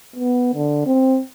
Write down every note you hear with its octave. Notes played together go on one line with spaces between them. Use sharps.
B3
D3
C4